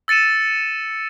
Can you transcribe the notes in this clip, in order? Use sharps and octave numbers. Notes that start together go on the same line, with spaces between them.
E6 A6 C#7 D#7 E7